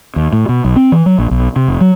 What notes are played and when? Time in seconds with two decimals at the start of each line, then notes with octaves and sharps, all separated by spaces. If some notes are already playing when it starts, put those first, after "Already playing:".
0.16 D#2
0.33 A2
0.49 B2
0.65 B1
0.76 C4
0.92 E3
1.06 F#3
1.18 A#1
1.31 B1
1.56 C3
1.68 F1
1.81 F#3